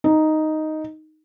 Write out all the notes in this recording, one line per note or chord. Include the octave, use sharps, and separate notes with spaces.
D#4